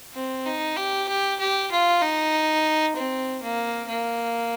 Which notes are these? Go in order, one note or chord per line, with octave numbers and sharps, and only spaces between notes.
C4
D#4
G4
G4
G4
F4
D#4
C4
A#3
A#3